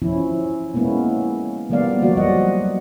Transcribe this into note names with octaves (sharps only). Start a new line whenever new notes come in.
F3 C#4 E4
G#3 A#3 B3 C#4 E4
F3 G3 A#3 B3 D5 F5
F3 F#3 A#3 F#4 D5
F3 G3 D#5 F#5